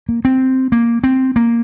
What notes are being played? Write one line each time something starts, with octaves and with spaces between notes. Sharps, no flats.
A#3
C4
A#3
C4
A#3